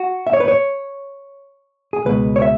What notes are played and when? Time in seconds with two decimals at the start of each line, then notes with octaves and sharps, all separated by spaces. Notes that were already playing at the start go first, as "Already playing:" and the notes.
Already playing: F#4
0.27 E5
0.33 C#5
0.40 B4
0.48 C#5
1.93 G#4
2.05 C#2 B2 G#3 B4
2.36 C#5
2.42 E5